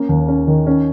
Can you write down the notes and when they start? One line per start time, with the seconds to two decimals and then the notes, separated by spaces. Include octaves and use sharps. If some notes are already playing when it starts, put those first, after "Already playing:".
Already playing: A#3 C#4
0.09 D#2
0.28 C#4
0.47 D#3
0.67 C#4